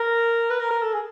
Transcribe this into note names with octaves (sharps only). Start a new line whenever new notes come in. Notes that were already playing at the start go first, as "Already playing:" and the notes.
Already playing: A#4
B4
A#4
A#4
A4
G#4